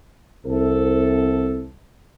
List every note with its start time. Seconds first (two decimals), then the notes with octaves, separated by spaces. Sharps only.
0.46 C2 A4